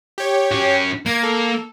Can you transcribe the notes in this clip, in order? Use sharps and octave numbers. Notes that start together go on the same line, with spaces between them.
G4 C#5
C#4 F#4
A#3 G#6
A4